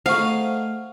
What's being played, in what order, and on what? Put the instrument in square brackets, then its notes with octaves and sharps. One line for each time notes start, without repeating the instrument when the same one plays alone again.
[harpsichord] A3 D#4 G#4 [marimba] C5 C#6 [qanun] F5 [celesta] F#5